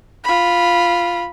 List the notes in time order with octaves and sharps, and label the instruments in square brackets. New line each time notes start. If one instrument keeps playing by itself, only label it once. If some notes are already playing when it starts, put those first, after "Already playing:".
[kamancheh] F4 B5